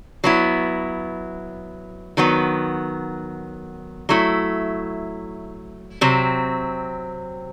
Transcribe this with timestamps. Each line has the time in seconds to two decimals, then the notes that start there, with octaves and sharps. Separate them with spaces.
0.24 F#3 B3 E4
2.17 D#3 F#3 B3
4.09 F#3 A3 E4
6.01 C3 F#3 C4